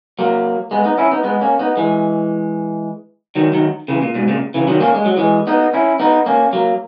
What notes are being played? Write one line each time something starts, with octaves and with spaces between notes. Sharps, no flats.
F#3 A#3
G#3 B3
B3 D#4
C#4 E4
B3 D#4
G#3 B3
A#3 C#4
B3 D#4
E3 G#3
D#3 F#3
D#3 F#3
C#3 E3
A#2
G#2 B2
A#2 C#3
C#3 E3
D#3 F#3
A#3 C#4
G#3
F#3
E3 G#3
B3 D#4
C#4 E4
B3 D#4
A#3 C#4
F#3 A#3